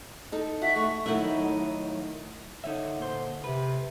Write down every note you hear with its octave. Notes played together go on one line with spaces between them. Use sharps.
D#4 A4
F#4 E5
A3 C#6
D#3 F#3 A3 D#4 E4 F#5
D3 D#4 C#5 E5
A#2 C5
C3 B4